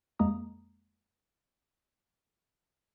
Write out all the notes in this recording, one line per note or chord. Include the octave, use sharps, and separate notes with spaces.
F2 G#3 A#3 A#5 D#6